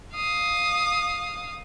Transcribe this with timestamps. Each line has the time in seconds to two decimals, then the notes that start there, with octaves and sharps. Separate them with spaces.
0.14 F5 D#6